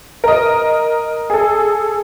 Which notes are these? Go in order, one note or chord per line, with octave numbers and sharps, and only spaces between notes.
A#4 D#5
G#4 A4